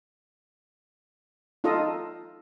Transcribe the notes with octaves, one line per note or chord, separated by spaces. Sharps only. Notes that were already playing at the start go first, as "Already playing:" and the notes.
D#4 F4 A4 D#5